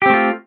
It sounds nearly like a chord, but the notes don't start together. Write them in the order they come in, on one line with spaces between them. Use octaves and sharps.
G4 C4 A3 F4